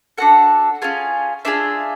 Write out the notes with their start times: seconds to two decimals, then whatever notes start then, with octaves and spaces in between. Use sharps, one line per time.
0.18 D4 F#4 A4 F#5
0.82 C#4 F4 G#4
1.45 D4 F4 G#4 E5